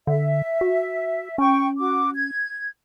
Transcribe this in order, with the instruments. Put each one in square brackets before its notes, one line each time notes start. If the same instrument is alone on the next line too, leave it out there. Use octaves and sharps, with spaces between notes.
[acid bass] D3 [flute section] E5
[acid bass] F#4
[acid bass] C#4 [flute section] G5 C#6
[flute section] F#4 D6
G#6